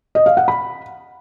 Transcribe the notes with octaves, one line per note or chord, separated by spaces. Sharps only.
D#5
F5
F#5
B5